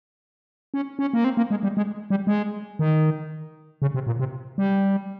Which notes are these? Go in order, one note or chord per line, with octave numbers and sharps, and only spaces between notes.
C#4
C#4
A#3
C4
A#3
G#3
G3
G#3
G3
G#3
D#3
C#3
C3
A#2
C3
G3